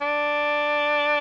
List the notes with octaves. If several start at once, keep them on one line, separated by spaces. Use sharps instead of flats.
D4